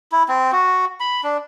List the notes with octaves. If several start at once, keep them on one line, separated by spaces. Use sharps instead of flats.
E4
C4
F#4
B5
D4